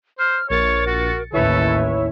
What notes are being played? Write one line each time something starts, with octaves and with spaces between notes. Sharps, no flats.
C5 F6
A#1 A#4 C#5 A6 C#7
F#4
A1 D#2 E4 A4 B4 C#5 E5